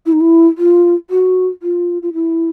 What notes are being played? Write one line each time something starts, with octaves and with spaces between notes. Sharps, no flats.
E4
D#4
E4
F4
F#4
F4
F4
E4